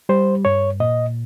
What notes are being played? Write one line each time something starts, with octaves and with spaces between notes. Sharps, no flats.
G3 C5
G2 C#5
A#2 D#5